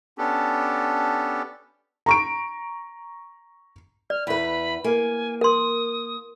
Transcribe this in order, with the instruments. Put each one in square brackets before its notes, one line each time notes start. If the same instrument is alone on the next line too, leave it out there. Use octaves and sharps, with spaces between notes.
[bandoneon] B3 C#4 D4 G4 A4
[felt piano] A#5 C#6 D7
[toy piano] D5 [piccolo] F6
[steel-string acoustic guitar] E2 B4 [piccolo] B5
[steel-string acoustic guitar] A#3 [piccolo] G#5
[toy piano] A#4 C6 [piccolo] D#6